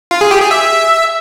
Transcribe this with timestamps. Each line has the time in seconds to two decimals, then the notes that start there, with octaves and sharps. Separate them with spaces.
0.11 F4
0.21 G#4
0.31 G4
0.41 G#4
0.51 E5